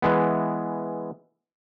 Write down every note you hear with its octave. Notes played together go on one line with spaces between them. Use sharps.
E3 G#3 B3